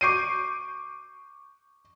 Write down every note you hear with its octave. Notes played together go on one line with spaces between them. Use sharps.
C#6 D6 G6 C7 D7 D#7